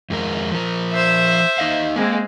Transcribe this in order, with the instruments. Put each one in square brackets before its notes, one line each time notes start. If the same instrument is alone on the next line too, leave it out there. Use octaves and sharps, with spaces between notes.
[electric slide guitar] F2 G#3 A#4
F3 A#4
[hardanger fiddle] C5 E5
[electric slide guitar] D#4 D#5 F5
[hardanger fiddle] G#3 C4 [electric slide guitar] A#3